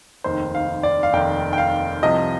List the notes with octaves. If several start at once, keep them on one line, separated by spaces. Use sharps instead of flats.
F1 D#2 D#3 C5
F5
D5
F5
F1 D#2 D#3 G5
G5
F5
C2 C3 F3 D#5